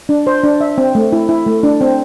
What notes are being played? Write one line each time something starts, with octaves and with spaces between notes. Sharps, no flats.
D4
C5
D4
E5
C4
A3
E4
E4
A3
D4
C4